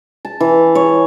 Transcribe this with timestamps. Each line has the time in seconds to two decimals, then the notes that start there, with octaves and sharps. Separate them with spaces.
0.25 A5
0.40 E3
0.75 C#5